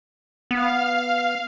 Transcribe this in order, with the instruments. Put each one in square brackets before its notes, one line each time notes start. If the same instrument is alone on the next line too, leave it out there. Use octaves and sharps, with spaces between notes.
[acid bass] B3 [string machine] F5